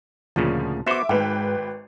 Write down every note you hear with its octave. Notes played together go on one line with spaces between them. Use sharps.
D2 A#2 C#3 F3
B3 F#4 C5 E5 D6
G#1 G#2 B4 G5